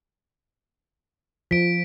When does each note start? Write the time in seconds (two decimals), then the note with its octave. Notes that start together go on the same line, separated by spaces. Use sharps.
1.51 F3 B6 D7